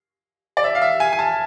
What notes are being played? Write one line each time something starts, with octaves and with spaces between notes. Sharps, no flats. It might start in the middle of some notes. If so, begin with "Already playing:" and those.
D5
E5
F5
E5
G#5
G#5
A5